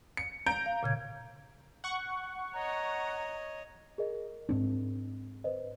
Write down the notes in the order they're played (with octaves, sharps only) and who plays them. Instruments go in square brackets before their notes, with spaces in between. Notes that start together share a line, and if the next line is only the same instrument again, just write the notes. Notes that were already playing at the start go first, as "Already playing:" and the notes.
[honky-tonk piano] C#7
A#5 G6 D7
[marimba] F5
A#2 C#3 G#6
[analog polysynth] F#5 C#6
[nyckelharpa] C#5 D#5 [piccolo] A#5
[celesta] G#4 A#4 D#5
[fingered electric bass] G#2 C4 D4
[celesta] B4 C5 D#5